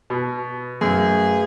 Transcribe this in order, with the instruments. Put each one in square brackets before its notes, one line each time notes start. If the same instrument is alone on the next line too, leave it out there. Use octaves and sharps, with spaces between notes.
[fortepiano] B2
[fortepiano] F#2 [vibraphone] A3 B4 F5 [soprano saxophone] G#4